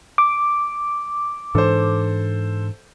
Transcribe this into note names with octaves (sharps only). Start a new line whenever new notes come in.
D6
G#2 E3 D4 A4 C5